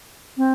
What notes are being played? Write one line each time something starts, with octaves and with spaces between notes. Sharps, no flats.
C4